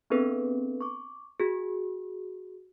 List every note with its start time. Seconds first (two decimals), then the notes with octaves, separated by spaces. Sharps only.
0.10 B3 C4 D4 G#4 A4 B4
0.81 C#6 D6
1.40 F#4 G#4